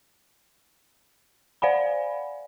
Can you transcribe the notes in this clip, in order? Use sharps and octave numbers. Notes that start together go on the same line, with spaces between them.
C5 D5 F5 F#5 G#5 B5